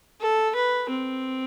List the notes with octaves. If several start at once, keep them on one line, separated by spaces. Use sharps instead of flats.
A4
B4
C4